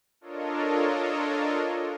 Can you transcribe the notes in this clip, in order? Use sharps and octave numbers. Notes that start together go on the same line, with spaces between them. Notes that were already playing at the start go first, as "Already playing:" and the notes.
D4 F4 A4 A#4 C#5 D#5